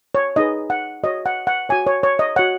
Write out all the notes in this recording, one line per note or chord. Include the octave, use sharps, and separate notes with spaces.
C#5
D#4 G#4 B4 D#5
F#5
F#4 C#5 D#5
F#5
F#5
F#4 C#5 G#5
C#5
C#5
D#5
F#4 C#5 F#5